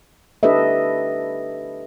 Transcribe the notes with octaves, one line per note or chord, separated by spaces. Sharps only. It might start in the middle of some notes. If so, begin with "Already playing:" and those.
D4 G4 A4 B4 D#5 E5